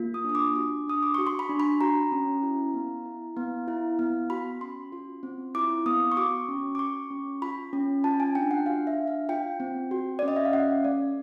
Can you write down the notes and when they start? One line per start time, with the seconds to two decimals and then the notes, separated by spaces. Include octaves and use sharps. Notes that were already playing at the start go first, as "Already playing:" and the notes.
Already playing: A#3 F4
0.14 D#6
0.24 D4 D#6
0.35 D6
0.56 F#4 D6
0.87 D4 D#6
1.02 D6
1.14 F#4 C#6
1.27 C6
1.39 B5
1.49 D4
1.60 B5
1.81 F#4 A#5
2.12 C#4
2.43 E4
2.74 B3
3.06 E4
3.36 B3
3.68 E4
3.99 B3
4.30 F#4 B5
4.61 C#4 C6
4.92 F4
5.23 C4
5.55 E4 D6
5.86 B3 D#6
6.12 C#6
6.17 F#4 D6
6.48 C#4
6.75 D6
6.79 F#4 C#6
7.10 C#4
7.42 F4 B5
7.73 C#4
8.04 F4 A5
8.20 G#5
8.35 D4 G5
8.51 F#5
8.66 F#4 F5
8.87 E5
8.98 D4
9.08 F5
9.29 F4 G5
9.60 C4
9.91 F#4
10.19 D5
10.23 C#4
10.28 D#5
10.36 E5
10.45 F5
10.53 C#4 F#5
10.84 A3 D5